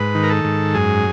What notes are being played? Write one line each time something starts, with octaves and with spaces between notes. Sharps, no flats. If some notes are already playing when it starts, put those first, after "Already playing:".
Already playing: G#2 B4
D#3
A#4
A4
G#2
F#2 G#4